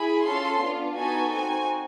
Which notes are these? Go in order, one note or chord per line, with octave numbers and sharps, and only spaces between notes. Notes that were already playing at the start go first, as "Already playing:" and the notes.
Already playing: E4 G#4 B5
C#4 F4 A4 C6
B3 D4 F4
B3 D#4 F#4 A4 G#5
C4 D#4 F#4 G#5